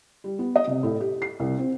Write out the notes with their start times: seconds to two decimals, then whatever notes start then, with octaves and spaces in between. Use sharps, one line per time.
0.24 G3
0.39 B3
0.56 D#5
0.67 C3
0.83 A2
1.00 G4
1.22 C7
1.40 C2
1.58 C4